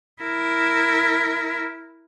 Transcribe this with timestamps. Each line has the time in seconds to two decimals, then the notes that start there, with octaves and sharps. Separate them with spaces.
0.22 E4 A#4